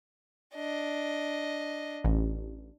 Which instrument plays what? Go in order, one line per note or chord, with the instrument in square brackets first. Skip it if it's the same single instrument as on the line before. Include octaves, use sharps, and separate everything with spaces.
[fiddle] D4 D#5
[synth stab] A1